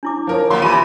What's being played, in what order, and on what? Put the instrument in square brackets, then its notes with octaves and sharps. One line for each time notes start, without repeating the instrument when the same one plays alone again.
[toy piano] D4 E4 D6
[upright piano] F3 A#4 C#5
[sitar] F#3 G3 [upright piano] A#3 C6
[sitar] C3 E3 [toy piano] F4 B5 C6 [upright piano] D#7